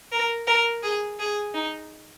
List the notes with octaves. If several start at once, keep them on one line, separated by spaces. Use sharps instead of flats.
A#4
A#4
G#4
G#4
D#4